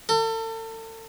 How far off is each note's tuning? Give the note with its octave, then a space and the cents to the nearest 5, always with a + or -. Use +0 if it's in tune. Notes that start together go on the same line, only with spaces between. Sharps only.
A4 +35